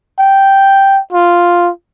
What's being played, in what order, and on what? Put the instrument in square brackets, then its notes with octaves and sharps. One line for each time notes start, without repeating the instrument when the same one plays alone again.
[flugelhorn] G5
F4